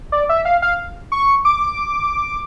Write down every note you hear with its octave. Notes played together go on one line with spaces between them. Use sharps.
D5
E5
F5
F5
C#6
D6